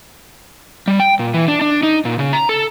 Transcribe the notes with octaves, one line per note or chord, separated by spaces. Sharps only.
G3
G5
A#2
E3
D4
D4
D#4
A#2
C#3
A#5
A4